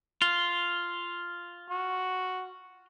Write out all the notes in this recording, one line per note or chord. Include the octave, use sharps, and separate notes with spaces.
F4
F#4